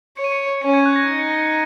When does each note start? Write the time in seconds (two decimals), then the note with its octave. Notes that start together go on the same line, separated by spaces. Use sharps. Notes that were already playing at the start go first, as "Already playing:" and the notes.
0.17 C#5 C#7
0.24 D#7
0.32 C#7
0.62 C#4 C#7
0.74 G#6
0.86 F#6
0.93 G#6
0.96 A#6
1.07 D#4 C#7
1.19 C#7
1.30 A#6
1.42 C#7